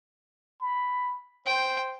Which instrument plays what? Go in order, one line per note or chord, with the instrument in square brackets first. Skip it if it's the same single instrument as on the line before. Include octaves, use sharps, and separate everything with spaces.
[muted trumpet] B5
[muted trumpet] C5 [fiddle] G5